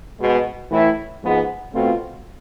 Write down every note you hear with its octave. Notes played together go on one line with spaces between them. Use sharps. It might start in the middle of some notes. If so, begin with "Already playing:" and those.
B2 G#3 B3
A2 E3 A3 E4
G#2 F3 G#3 B3
B2 A3 C4 F4